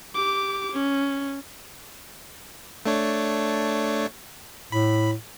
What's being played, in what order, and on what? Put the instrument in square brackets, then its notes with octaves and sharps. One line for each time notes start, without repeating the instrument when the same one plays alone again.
[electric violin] G4 D6
C#4
[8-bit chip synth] A3 D4 C#5
[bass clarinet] A2 [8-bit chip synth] B5